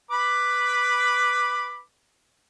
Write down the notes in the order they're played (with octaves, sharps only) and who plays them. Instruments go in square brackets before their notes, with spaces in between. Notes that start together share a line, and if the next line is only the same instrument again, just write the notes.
[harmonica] B4 B5 D6